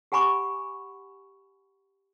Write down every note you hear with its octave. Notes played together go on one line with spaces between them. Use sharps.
G4 F#5 G#5 B5 C#6 D6